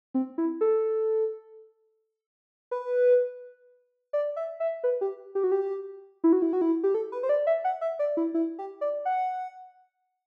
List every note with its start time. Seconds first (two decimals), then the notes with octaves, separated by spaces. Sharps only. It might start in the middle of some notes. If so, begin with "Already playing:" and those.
0.14 C4
0.38 E4
0.61 A4
2.71 B4
4.13 D5
4.36 E5
4.60 E5
4.84 B4
5.01 G4
5.35 G4
5.44 F#4
5.52 G4
6.24 E4
6.33 F#4
6.42 E4
6.53 F#4
6.61 E4
6.84 G4
6.94 A4
7.12 B4
7.23 C5
7.29 D5
7.47 E5
7.64 F#5
7.81 E5
7.99 D5
8.17 E4
8.34 E4
8.59 G4
8.81 D5
9.05 F#5